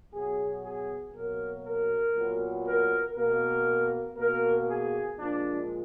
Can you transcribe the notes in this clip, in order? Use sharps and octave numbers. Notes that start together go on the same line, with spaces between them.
B2 F#3 B3 G#4
G#4
B2 F#3 A#3 A#4
A#4
A#2 F#3 B3
A#4
B2 A#3 A#4
B2 A#3 A#4
G#4
A#2 F3 G#3 D4